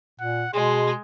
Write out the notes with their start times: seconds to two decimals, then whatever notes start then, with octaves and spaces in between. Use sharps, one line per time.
0.20 A#2 F#5
0.53 B2 G#3 G#4 C6